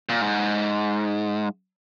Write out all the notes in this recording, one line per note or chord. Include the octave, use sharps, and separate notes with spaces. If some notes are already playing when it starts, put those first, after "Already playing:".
A#2
G#2